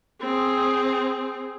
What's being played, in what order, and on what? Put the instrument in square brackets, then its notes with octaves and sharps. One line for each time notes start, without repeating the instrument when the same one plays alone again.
[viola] C4 G#4